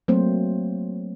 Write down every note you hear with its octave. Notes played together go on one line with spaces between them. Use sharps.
F#3 A3 A#3 C4 C5